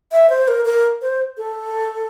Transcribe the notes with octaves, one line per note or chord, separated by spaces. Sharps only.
E5
C5
A#4
A#4
C5
A4